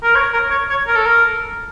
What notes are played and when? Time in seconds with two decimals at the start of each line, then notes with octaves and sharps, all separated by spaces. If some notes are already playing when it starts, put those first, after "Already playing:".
0.03 A#4
0.15 C#5
0.33 A#4
0.50 C#5
0.69 C#5
0.87 A#4
0.96 A4
1.06 A#4